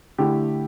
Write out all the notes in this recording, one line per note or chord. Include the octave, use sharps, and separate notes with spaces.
D3 A3 E4 G4